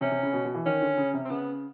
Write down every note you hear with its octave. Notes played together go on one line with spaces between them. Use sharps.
C3 C#4
C3
C#3
B2
B2
E3
D#3 C#4
D3
C#3
C3
C4
C#3 B3